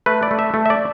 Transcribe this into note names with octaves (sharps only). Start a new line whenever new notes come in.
A3 B4
D5
A3
E5
A3
E5
D5